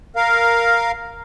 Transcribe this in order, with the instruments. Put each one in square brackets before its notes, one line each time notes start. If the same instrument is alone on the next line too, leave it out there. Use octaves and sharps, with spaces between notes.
[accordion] A#4 F5